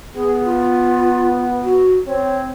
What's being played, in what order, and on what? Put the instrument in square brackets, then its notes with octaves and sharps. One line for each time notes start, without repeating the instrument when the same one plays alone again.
[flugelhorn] B3 [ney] G#4
[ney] F4
F#4
[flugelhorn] C4 [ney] C#5